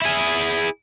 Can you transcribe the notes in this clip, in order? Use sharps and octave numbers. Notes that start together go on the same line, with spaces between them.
E4 G#4